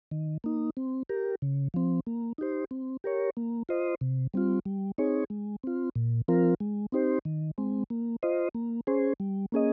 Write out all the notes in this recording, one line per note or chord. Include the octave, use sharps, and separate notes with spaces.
D#3
A#3 D#4
C4
G4 A#4
C#3
F3 C4
A#3
D#4 G4 C5
C4
G4 A#4 C#5
A#3
F4 C5 D#5
C3
G3 C4 F4
G3
C4 D#4 G#4 C#5
G#3
C4 F4
A#2
F3 C4 F4 A#4
G#3
C4 D#4 G4 C5
D#3
G#3 C4
A#3
F4 C5 D#5
A#3
C#4 G#4 C5
G3
A#3 C#4 G#4 D#5